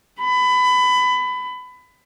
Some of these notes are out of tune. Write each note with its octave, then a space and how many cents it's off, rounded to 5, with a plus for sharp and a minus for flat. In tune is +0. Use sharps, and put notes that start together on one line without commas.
B5 +20